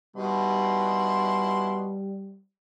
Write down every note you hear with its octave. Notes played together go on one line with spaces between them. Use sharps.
B2 D#3 G3 E4 C6